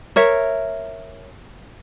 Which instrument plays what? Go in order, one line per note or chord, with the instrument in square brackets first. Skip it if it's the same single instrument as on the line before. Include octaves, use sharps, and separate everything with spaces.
[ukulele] A#4 C#5 E5